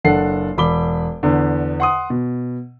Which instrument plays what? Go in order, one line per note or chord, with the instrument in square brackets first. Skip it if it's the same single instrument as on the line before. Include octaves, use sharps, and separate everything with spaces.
[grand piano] F#1 D4 A4 F#5 C7
E1 B5 D6 G7
E2 D3
F#5 C6 D#6
B2